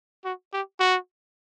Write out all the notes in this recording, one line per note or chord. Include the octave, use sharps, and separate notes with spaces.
F#4
G4
F#4